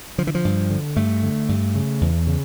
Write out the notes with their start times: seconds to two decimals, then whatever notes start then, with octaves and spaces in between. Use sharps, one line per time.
0.18 D3 F3
0.27 E3
0.35 F3
0.45 G2
0.70 D3
0.96 G2 A3
1.23 D3
1.49 G2
1.75 C#3
2.01 E2
2.27 C#3